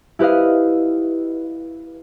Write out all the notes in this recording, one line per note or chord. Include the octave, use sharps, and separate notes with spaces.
E4 G4 B4 D#5 F5